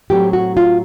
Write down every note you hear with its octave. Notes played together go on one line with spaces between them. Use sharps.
A2 F#3 A3 C4 G4
F#4
F4